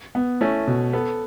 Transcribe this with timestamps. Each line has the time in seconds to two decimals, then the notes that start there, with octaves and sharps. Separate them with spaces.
0.15 B3
0.41 A3 C#4 E4
0.67 B2
0.93 B3 A4